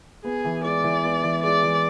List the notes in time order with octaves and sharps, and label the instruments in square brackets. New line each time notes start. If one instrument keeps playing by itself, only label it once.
[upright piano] B3 [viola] G#4
[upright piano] E3
[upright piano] G#3 [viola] D5
[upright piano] E3
B3
E3
[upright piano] G#3 [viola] D5
[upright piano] E3